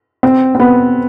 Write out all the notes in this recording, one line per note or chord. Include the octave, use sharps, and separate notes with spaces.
C4
C4
B3